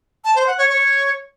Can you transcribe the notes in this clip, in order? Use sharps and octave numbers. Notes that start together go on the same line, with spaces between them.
A5
C5
F#5
C#5
C#5